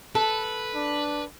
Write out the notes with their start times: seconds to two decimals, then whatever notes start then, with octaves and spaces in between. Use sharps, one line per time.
0.15 A4 B4
0.75 D4